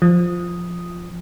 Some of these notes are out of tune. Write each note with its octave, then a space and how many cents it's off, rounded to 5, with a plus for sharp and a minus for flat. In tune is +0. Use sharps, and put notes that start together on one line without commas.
F3 +0 D#6 +0